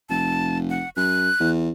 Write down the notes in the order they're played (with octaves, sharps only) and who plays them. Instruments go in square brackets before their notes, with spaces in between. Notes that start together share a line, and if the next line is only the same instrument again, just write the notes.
[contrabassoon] F1 [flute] A5
[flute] F#5
[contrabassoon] F#2 [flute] F#6
[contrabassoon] E2